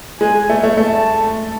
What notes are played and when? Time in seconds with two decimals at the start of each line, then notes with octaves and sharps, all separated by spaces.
0.21 G#3 G#5
0.49 A3
0.63 A3
0.77 A3 A5